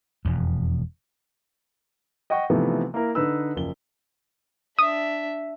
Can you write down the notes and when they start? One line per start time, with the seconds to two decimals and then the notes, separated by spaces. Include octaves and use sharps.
0.25 E1 F2
2.30 D#5 F#5 G5 C#6
2.50 C3 E3 F3 A3 B3 D#4
2.94 A#3 E4 A#4
3.15 D3 D#4 B4 E6
3.56 F#1 F3 G7
4.79 D4 E5 D#6